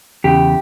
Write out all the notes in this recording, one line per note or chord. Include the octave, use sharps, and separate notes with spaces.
E2 C#3 G4